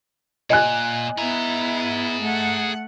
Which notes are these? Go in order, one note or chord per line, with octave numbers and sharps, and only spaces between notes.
A#2 D#5 G#5 F#6
B3 E4 G#4 A#5
A3 F#5